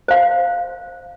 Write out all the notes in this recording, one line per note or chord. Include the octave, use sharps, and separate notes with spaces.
C5 F5